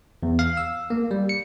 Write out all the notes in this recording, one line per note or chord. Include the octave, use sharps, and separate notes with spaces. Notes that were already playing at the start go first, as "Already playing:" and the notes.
E2
F5
E6
A#3
G3
C#7